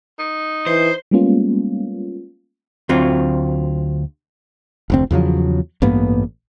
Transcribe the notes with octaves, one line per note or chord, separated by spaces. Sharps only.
D#4
E3 C5
G3 G#3 A#3 B3 C#4 F4
D2 F#3 C4 F4
F1 D2 C4
E2 C#3 F3 F#3
A1 G2 A#3 B3